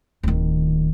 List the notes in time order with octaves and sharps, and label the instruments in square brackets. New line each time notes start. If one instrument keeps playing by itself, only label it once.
[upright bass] D1 D#3